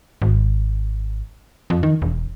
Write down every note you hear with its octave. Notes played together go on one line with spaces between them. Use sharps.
G#1
F2
D#3
E1